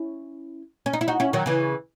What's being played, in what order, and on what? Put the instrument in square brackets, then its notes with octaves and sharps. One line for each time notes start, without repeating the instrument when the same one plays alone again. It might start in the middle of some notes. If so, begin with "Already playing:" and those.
Already playing: [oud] C#4 E4
C#4
D#4
E4
D#4 F#4
C#4 E4
D#3 F#3
C#3 E3